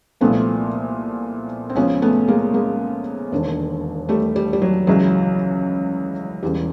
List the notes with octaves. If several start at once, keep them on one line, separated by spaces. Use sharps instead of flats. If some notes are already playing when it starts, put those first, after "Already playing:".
C2 A#2 F3 A3 B3
C4
C#2 C#3 F3 B3 C#4
A3 B3
G#3 A#3
G#3 A#3
E1 D#2 D3
G3 A3
G3
G3
F#3
C#2 C#3 E3 F#3
E1 E2 C#3 G3